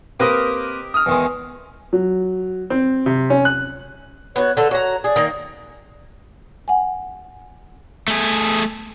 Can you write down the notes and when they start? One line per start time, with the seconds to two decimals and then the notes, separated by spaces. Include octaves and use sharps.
0.20 A#3 C4 G4 A#4 B4 D#5
0.94 D#6 F6
1.06 E2 D#3 G#3
1.93 F#3
2.70 C4
3.06 C3
3.30 C#4
3.45 F#6
4.36 B3 F#4 C#5
4.57 D3 A3 A4
4.71 F#4 C#5 A#5
5.04 G#4 D5
5.16 D#3 A#3
6.68 F#5 G#5
8.08 A3 G#4